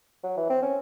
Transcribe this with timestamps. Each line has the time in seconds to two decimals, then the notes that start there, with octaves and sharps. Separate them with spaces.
0.23 F#3
0.37 E3
0.50 C4
0.62 C#4